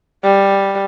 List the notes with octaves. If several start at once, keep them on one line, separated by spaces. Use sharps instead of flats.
G3